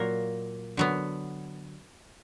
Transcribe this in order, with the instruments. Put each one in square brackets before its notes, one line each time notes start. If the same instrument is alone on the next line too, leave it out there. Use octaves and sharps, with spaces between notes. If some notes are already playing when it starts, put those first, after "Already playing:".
Already playing: [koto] A#2 F#3 A#3
D3 F#3 B3